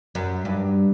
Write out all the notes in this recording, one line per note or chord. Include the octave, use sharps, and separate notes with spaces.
F#2
G2